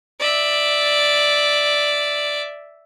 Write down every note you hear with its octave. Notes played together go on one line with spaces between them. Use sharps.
D5 E5